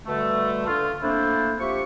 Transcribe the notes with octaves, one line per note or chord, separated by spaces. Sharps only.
B2 D3 G3 A3
D3 F4
A3 A#3 C4 D4 E4 C5
F3 G4 E5 C#6